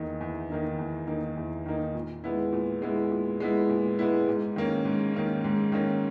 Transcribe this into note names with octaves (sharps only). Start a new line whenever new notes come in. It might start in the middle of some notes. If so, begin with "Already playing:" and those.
Already playing: E2 D#3 A#3 D#4
E2
D#3 A#3 D#4
E2
D#3 A#3 D#4
E2
D#3 A#3 D#4
A#2
G#3 B3 E4
A#2
G#3 B3 E4
A#2
G#3 B3 E4
A#2
G#3 B3 E4
G#2
D#3 A#3 C#4
G#2
D#3 A#3 C#4
G#2
D#3 A#3 C#4